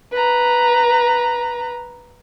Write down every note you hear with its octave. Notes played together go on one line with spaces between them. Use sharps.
B4 A#5